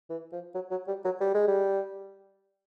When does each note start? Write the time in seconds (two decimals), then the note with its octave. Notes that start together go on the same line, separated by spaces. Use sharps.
0.10 E3
0.32 F3
0.54 F#3
0.71 F#3
0.88 G3
1.05 F#3
1.21 G3
1.34 G#3
1.48 G3